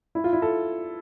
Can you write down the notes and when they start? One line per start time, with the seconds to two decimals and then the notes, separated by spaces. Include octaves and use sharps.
0.15 E4
0.24 F4
0.33 E4
0.42 A4